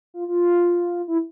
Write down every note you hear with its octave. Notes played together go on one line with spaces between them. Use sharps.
F4
F4
E4